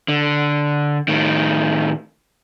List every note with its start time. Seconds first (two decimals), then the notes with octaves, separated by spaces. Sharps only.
0.08 D3
1.08 A2 D#3